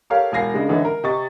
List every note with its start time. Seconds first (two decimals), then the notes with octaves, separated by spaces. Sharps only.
0.10 G4 A4 A#4 C#5 F5
0.32 E1 F5 G#5 A#6 C7
0.54 C#3 G#3 D4
0.69 D3 E3 C#4 D#4 A4
0.85 A#4
1.04 C3 D#5 C#6 A6